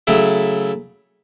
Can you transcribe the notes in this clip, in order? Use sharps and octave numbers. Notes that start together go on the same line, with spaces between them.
C#3 F#3 A3 E4